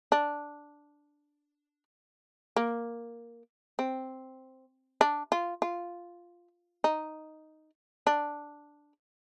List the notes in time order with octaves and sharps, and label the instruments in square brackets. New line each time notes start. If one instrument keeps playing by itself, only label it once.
[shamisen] D4
A#3
C4
D4
F4
F4
D#4
D4